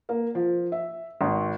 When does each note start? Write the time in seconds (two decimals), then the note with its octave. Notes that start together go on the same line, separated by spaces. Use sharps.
0.09 A#3
0.35 F3
0.72 E5
1.21 G#1